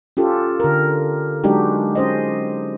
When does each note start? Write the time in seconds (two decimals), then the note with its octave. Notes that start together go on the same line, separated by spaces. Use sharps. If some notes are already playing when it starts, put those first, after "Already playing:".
0.17 C#4 F4 G4 A4
0.60 D3 A#4
1.44 F#3 G#3 D4 D#4 F#4 G4
1.95 C#4 C5 D#5